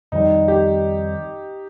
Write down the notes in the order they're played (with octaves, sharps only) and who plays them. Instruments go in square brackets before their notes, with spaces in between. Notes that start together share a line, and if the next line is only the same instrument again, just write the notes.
[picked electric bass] F2 D#3 G3 [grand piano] D#4
[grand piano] G4